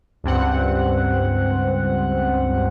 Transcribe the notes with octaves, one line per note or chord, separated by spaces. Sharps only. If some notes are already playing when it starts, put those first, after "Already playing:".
C#2 G2 C4 F#5